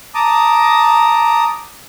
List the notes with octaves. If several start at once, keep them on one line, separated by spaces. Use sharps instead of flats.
A5 A#5 D6 D#6